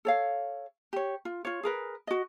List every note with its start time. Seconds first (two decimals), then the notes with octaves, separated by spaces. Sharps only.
0.05 A4 C#5 F5
0.93 G4 C#5
1.25 F4
1.45 F4 C#5
1.63 G#4 A#4 B4
2.07 F#4 D#5